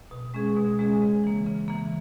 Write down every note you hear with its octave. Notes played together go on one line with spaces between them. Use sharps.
B2
G#3 C#4 G#4
B2
G#3 C#4 G#4
C#3
E3 A#3
C#3
E3 A#3